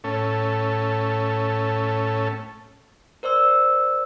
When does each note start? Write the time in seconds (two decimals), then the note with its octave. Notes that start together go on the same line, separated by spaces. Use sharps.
0.04 A2 C#4 A4
3.23 A#4 C5 D5 E6